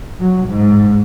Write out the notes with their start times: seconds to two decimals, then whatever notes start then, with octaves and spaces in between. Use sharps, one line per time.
0.20 F#3
0.48 G#2